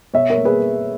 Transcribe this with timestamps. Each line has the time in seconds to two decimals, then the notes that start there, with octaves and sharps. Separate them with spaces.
0.14 B2 C#5 E5
0.30 A#4 C#5
0.37 A#3
0.45 G#4 B4